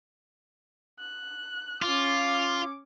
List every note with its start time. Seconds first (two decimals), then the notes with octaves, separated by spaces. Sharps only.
0.99 F#6
1.82 C#4 F4 D6